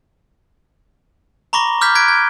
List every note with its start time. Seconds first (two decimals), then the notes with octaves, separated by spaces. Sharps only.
1.53 A#5 B5 C#6 D6 A#6 G7
1.81 D6 F6 G6 G#6 B6
1.95 F#6 G#6 B6 D7
2.08 G#6